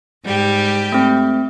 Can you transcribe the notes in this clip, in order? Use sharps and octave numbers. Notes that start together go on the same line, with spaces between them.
G#2 G3 G4
A3 C4